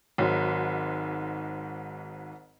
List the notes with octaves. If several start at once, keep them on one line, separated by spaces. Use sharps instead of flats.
G#1 G#2 F#3